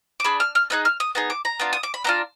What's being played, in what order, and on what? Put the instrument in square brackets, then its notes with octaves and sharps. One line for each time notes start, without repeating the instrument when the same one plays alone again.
[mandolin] D6
D4 G#4 B5
F6
F6
B3 D#4 G#4 F#6
F6
D#6
B3 D#4 G#4
D6
A#5
B3 D4 F4
D#6
D6
B5
B3 D4 F4 A#5